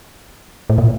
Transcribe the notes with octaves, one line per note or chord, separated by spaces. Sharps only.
A2
A#2